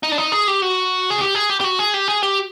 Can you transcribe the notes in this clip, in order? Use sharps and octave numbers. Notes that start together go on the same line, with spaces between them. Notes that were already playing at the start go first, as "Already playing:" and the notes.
D#4
D4
D#4
G#4
G4
F#4
G#4
G4
G#4
G4
G4
F#4
G#4
G4
G#4
G4